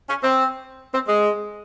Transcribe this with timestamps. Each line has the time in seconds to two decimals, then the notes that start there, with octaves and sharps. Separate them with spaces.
0.09 C#4
0.23 C4
0.94 C4
1.08 G#3